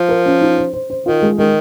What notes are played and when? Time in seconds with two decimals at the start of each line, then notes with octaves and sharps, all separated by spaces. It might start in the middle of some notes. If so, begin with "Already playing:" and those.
Already playing: F3
0.09 A#4
0.26 C#4
0.41 D#4
0.58 C5
0.73 C5
0.90 C5
1.06 D#3 F4
1.22 G#3
1.38 D#3 G#3